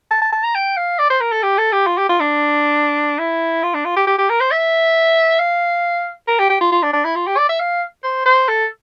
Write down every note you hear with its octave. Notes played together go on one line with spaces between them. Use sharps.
A5
A5
A5
A#5
G5
F5
D5
C5
A#4
A4
G4
A4
G4
F4
G4
F4
D4
E4
F4
D4
F4
G4
G4
G4
A#4
C5
E5
F5
A#4
G4
G4
F4
F4
D4
D4
E4
F4
G4
D5
E5
F5
C5
C5
A4